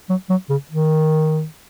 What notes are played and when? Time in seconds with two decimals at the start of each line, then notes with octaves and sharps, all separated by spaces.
0.09 F#3
0.30 F#3
0.50 C#3
0.71 D#3